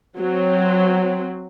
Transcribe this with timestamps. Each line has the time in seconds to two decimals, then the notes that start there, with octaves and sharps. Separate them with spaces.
0.18 F#3 C4